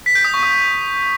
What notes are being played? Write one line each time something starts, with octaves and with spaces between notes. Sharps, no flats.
B6
G6
D#6
C#6
D#6